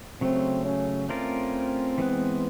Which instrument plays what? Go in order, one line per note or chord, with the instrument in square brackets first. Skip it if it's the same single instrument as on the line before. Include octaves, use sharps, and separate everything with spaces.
[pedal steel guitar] C#3 F#3 A3 [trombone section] C4
[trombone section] C#4
[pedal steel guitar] A3 C#4 F4 A#4 D5 [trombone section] C4
[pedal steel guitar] E3 G#3 B3